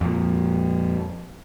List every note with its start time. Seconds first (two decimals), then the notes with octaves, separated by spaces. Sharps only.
0.01 F2 A#2